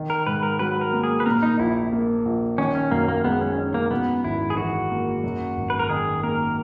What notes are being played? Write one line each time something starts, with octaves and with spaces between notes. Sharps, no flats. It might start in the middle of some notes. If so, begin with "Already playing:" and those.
Already playing: D#3
A#4
G#2 B4
A#4
F#3 B4
A#4
A#3
G#4
B4
A#2 A#4
D#4
A#1 E4
A#3
A#1
D#3 C#4
C#4
F#2 A#3
A#3
G#3 B3
C#4
D#4
A#3
F#2 B3
G#1 E4
G#4
E3 F#4
A#3
F#2
G#1
B4
A#4
D#3 G#4
A#3 A#4